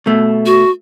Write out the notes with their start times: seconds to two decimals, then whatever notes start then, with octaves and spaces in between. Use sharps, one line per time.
0.06 B2 A3
0.46 F#4